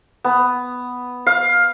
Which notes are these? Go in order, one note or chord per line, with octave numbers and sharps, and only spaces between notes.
B3
F5